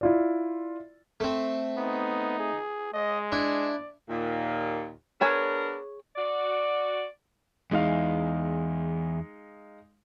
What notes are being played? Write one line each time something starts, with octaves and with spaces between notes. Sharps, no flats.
E4 F4 D5
A3 C4
B3 D#4
G#4
G#3 D#5
D4 E4 D5
D#2 A#2
B3 D4 G#4 A#4 C#5 G#5
F#4 D5
E2 G#3 D#4 F5